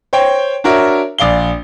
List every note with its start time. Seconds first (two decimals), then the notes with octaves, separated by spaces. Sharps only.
0.13 C5 C#5 G5
0.64 D4 F#4 A#4 C#5 E5
1.18 A#1 D5 F5 G7